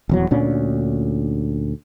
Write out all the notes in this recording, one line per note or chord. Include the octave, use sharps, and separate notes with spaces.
D#1 E2 F#3
D2 A#2 C#4 D4